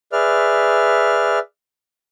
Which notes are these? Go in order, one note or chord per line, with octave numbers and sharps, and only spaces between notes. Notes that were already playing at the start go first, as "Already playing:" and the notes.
G#4 B4 D5 E5 F6